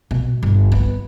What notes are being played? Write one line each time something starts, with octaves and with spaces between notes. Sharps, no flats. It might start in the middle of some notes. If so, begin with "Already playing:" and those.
B2
G1
B3